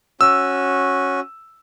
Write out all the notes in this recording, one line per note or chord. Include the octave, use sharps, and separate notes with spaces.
C#4 F#4 E6